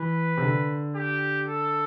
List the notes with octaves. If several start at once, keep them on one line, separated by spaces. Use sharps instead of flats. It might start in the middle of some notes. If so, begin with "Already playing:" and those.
Already playing: E3 B4
C3
D3
G4
A4